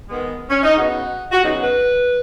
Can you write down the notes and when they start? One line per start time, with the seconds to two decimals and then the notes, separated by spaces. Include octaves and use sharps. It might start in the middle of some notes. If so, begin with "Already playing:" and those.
0.09 D#3 G#3 B3
0.50 C#4
0.63 D#4
0.76 C#3 B3 F#4
1.32 F#4
1.43 C#3 F#3 B3 D#4
1.60 B4